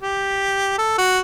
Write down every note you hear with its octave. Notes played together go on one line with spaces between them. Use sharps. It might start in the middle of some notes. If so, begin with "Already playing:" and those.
G4
A4
F#4